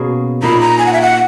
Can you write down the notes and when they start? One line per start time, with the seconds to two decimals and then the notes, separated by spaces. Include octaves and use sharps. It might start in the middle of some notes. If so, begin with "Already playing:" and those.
Already playing: B2 A#3 C#4 G#4
0.42 A#2 A#3 D#4 B5
0.61 A#5
0.79 G#5
0.86 F#5
0.93 E5
1.02 F#5